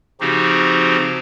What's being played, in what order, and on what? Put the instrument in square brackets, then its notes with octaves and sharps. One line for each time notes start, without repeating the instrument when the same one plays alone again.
[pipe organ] C#3 F3 C4 D#4 F#4 G4